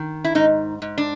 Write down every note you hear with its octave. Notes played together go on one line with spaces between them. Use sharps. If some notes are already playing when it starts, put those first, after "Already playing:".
Already playing: D#3
E4
G#2 D#4
G#2
D4